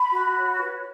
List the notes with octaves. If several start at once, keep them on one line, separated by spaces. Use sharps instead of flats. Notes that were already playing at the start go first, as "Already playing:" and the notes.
Already playing: B5
F#4
C#5
B4